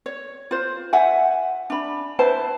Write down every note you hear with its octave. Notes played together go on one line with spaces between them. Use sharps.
C#5
F4 C5
E5 F#5 G#5
D4 B5
E4 B4 C5 A5